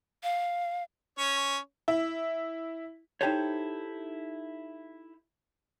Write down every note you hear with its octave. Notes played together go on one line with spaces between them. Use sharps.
F5
C#4 C#5
E4
D#4 E4 G4 A4 C5 C#5